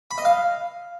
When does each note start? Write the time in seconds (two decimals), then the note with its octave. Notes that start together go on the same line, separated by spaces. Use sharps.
0.11 B5
0.18 D#5
0.25 F5